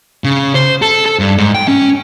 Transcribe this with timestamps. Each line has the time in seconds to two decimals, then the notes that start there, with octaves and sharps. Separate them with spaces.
0.24 C#3
0.55 C5
0.82 A4
1.06 A4
1.19 G2
1.38 G#2
1.54 G5
1.68 C#4